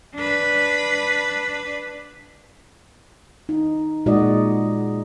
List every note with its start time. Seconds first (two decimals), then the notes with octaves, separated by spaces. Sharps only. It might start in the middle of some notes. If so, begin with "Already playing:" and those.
0.15 D4 B4
3.49 D#4
4.06 A#2 G#3 D#4 F#4 D5 D#5